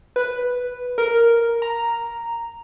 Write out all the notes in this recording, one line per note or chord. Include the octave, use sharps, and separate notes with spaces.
B4
A#4
A#5